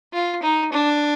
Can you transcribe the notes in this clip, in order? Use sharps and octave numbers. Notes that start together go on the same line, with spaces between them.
F4
D#4
D4